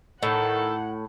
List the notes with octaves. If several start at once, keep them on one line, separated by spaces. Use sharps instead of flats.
A2 D#3 A4 F#5